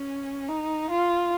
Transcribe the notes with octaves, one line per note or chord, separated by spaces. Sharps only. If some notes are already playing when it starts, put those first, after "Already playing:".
Already playing: C#4
D#4
F4